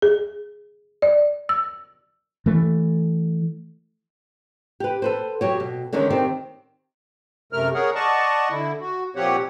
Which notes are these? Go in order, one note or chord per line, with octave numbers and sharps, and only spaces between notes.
G#4
D5
E6
E3 A3
G4 B4
A4 B4 C5
F#3 G4 C#5
B2
D3 D#3 G#3 C#4 D#4
D#3 C4 G4
F#2 C3 A3 A#4 F6
G#4 A#4 C#5 F#5
D5 D#5 F#5 A5 C#6
D3 E4
F#4
A#2 F3 C4 G4 C#5 F#5